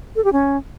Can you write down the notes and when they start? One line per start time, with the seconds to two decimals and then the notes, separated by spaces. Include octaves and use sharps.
0.16 A4
0.24 G4
0.33 C#4